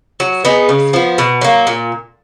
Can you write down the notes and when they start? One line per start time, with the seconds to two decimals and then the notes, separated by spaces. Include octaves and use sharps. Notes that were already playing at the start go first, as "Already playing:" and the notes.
0.20 F#3
0.45 B3 D#4 G#4
0.69 C#3
0.93 F3 B3
1.18 B2
1.41 F#3 A#3
1.67 A#2